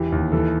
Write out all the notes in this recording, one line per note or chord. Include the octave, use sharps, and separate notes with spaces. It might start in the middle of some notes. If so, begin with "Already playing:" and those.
Already playing: E1 E3 G4
D#2
E3 A4